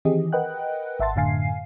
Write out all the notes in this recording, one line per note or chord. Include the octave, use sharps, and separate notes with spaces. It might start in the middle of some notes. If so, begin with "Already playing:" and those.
D#3 E3 C4 G4 G#4 D#5
A#4 B4 D#5 F#5 G5 F#6
G#1 E5 F#5 A5 C6 A6
F#2 A2 D3 F5 G#5 C7